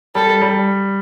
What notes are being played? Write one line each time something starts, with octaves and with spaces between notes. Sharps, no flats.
G3 A4
G3